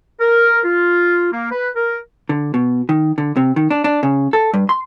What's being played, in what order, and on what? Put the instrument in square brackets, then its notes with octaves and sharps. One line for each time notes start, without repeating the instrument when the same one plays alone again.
[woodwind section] A#4
F4
A#3
B4
A#4
[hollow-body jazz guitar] D3
B2
D#3
D3
C3
D#3
D4
D4
C#3
A4
G2
C6